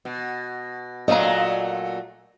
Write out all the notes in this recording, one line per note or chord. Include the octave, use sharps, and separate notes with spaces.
B2
A#2 F#3 A3 D#5 F5 A#5